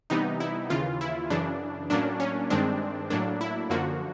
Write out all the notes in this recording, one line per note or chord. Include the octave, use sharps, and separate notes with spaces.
C3 E3 G3 B3 D#4
E4
D#2 C#3 E3 F4
E4
F#2 C#3 E3 D4
A2 F#3 A#3 C#4 D4
C#4
G2 D#3 G#3 C4 D4
A2 F#3 A#3 D4
E4
F#2 D3 F3 A#3 F#4